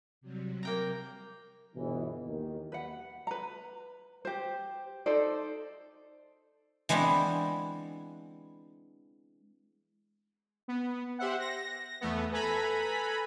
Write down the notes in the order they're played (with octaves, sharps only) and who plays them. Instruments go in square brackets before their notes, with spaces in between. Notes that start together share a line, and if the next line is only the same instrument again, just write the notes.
[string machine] C3 F#3 G3
[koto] A#3 G5 A#5
[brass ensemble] G1 B2 E3
D#2 D#3
[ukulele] B4 F#5
B4 A#5
G4 C5
D#4 A4 C5 D5
[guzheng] E3 G#3 B3 C4 D4
[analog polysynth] B3
G4 C5 E5 F#5
A#6
E2 A3 B3
A4 B4 G#5 A#5 B5